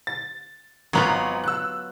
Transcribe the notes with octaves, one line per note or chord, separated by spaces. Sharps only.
A6
G#1 F#3 B3 F4 A#5
E6 F#6